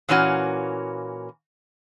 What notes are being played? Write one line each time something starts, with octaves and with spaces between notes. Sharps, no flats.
A#2 E3 A#3 C#4 F#4